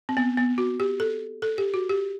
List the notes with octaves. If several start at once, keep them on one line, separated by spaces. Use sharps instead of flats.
C4
B3
B3
F#4
G4
A4
A4
G4
F#4
G4